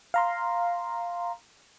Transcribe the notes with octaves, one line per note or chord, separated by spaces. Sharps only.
F5 A#5 C6